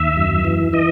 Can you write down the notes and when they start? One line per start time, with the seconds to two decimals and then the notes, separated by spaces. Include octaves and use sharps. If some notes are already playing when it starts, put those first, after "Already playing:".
Already playing: D#2 E5
0.17 F#2
0.44 E3
0.73 E3 D#5